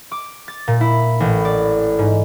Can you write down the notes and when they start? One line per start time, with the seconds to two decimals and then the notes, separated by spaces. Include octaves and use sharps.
0.12 D6
0.48 A6
0.68 A#2
0.81 E4
1.20 A1
1.45 D5
1.99 G#2